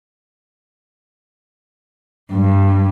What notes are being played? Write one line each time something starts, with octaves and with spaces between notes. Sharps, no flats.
G2